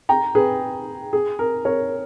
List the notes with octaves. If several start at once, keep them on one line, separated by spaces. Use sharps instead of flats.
G5 A#5
G#4 B4
G#4
A#4
A#4 C#5